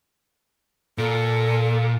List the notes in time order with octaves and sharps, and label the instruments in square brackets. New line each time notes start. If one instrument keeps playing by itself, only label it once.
[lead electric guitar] A#2 [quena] A4